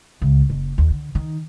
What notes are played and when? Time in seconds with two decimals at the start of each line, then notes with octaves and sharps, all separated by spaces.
0.21 C#2
0.50 F#1
0.78 D#2
0.90 D3
1.15 D#3